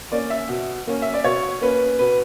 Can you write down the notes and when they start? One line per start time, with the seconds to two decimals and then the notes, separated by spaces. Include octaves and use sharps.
0.12 A#3 C#4 D5
0.30 E5
0.49 B2
0.87 A#3 C#4
1.02 E5
1.14 D5
1.24 B2 C#5
1.61 A#3 C#4 B4
1.99 B2 B4